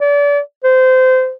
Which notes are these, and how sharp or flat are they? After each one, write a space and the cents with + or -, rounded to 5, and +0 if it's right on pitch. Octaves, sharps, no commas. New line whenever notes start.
D5 -35
C5 -25